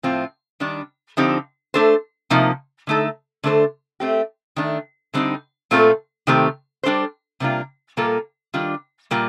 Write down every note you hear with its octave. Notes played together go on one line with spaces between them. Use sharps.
A2 F3 C4 F4
D#3 G3 D4
D3 F3 C4 D#4 G4
A3 D4 A4 C5
C3 F3 A#3 D#4
D3 A3 D#4 A4
D3 A3 D4 A4 C5
A3 C4 G4
D#3 A3 D4
D3 G3 C4 D#4
A#2 A3 C4 F4 A4
C3 D#3 A3 C4 G4
G3 D4 A4 C5
C3 G3 A#3 D4 F4
A#2 G3 A#3 F4 A4
D#3 G3 D4 F4
A#2 G3 A#3 F4